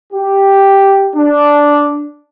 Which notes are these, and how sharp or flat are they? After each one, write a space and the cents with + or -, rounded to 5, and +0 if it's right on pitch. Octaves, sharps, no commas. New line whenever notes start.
G4 +0
D4 -5